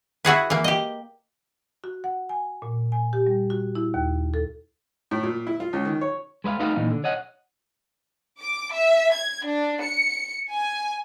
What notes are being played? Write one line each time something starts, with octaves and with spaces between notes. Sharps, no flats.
E4 F#4 G#4 B4
E3 A#3
G4 D#5
F#4
F#5
G#5
A#2
G#5
G4
G3
F#4
E4
D#2
A4
A2
A#2
E4
F4
C#2
D#3
C#5
G#3 B4 D#5 F5
A3 D#4 F#4 B4 F5
A#2 E3 D#4
D3
C#5 D#5 F#5
D6
E5
G#6
D4
C#7
G#5